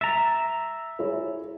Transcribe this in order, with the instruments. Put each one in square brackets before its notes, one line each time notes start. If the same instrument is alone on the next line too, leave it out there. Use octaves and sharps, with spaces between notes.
[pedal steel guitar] E5 A#5 [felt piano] A6
[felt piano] E4 G#4 C#5